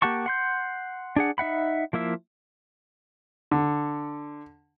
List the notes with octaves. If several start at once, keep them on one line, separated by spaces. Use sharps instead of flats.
A#3 G4 F#5 A5 C#6
F#5 C6 G6
D4 G#4 F#5
D#4 E5 F#5 B5
F3 A#3 E4 E5
D3